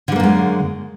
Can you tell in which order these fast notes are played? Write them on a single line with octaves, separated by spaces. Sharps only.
D3 G3 A#3 F#2 G#3